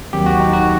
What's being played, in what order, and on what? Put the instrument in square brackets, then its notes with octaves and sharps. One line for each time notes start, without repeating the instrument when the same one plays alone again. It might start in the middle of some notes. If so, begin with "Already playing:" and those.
[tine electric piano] D#2 D#3 F#3 C4 G4
F#4
D#4
F#4